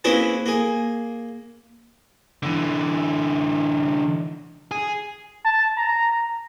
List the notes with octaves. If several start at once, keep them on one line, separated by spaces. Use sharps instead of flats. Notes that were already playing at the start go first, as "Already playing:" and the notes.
A#3 C4 C#4 E4 G#4 B4
A#3 G#4
D3 E3
G#4
A5
A#5